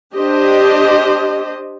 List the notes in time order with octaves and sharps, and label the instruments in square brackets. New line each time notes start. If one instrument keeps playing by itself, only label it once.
[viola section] D4 G4 C5 D#5